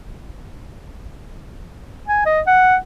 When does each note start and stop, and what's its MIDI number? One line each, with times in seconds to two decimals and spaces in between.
2.08 2.22 80
2.26 2.41 75
2.47 2.76 78